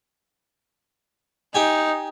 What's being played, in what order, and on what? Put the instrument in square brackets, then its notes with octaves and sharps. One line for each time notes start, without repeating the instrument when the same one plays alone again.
[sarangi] D#4 [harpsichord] G4 G#5